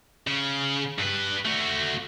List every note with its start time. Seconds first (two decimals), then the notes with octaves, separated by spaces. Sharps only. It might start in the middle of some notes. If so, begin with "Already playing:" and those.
0.27 C#3
0.99 G2 B4
1.45 A3 F#4